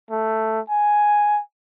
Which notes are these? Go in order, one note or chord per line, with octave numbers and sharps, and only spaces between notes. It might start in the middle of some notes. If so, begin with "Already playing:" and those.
A3
G#5